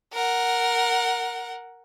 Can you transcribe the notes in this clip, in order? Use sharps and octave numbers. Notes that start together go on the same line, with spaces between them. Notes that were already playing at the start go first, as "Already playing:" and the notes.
A#4 F#5